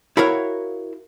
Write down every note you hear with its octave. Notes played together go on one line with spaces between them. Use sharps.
E4 F#4 A#4 C#5 F5